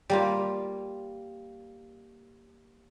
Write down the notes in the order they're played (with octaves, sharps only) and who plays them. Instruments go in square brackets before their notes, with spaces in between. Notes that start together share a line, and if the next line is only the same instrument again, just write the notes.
[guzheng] G3 A#3 F4